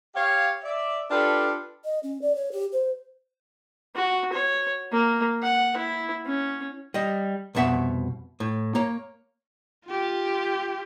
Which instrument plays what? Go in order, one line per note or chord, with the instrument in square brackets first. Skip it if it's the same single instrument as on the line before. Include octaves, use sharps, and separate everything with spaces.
[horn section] G4 C#5 F5
D5 E5
D4 F4 G4 A4 B4
[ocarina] D#5
C#4
D5
C#5
G4
C5
[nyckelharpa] F#4
C#5
A#3
F#5
E4
C#4
[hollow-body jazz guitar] G3 D#5
C2 F2 B2 E5 F#5
A2
A#3 C#5
[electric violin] F4 G4